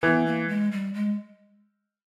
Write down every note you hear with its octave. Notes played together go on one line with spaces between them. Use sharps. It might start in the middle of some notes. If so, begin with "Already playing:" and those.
E3 B3
A#3
G#3
G3
G#3